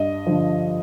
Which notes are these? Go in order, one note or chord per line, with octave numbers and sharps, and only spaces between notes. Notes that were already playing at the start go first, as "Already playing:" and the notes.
Already playing: G2 D#5
D3 F3